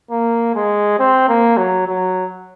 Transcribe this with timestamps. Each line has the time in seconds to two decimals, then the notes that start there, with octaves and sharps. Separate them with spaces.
0.11 A#3
0.55 G#3
0.98 C4
1.28 A#3
1.57 F#3
1.88 F#3